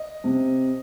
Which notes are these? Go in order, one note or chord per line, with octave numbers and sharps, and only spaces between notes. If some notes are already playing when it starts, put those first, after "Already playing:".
Already playing: D#5
C3